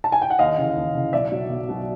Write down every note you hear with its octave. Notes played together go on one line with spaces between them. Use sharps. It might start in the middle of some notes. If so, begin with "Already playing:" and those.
A5
G#5
G5
F#5
D#2 D#5 F5
C#3 E3
D#2
C#3 E3
B1 D5 E5
B2 F#3
B1
B2 F#3